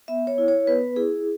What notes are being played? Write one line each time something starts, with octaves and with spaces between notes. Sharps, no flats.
B3 E5
C#5
E4
C#5
B3 B4
E4 G#4